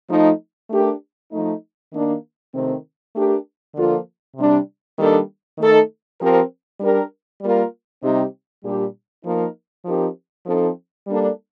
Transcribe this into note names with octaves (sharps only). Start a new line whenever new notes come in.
F3 A3 D#4
A3 D4 G4 A#4
F3 A3 D#4
D#3 A#3 D4
C3 D#3 A3 C4
A3 D4 G4 A#4
D3 F3 A#3 F4 A4
C3 G3 D4
D#3 G3 A#3 D4 A4
D#3 A3 D#4 A4
F3 C4 G4 A#4
G3 D4 G4 A#4
G3 A#3 F4 A#4
C3 G3 C4 D#4 G4
A#2 G3 D4 G4
F3 A#3 D#4 A#4
F3 C4 D#4 G4 A#4
F3 C4 D#4 A4
G3 A#3 D4 A4